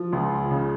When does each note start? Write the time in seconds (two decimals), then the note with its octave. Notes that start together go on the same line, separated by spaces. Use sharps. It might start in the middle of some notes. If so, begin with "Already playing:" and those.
Already playing: F3
0.12 C#2
0.51 C#3